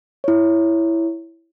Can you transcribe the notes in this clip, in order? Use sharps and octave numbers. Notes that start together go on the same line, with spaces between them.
E4 C#5